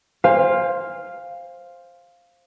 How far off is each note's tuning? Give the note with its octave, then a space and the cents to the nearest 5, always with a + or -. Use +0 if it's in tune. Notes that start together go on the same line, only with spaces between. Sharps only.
C5 +10 F5 +0 G#5 -40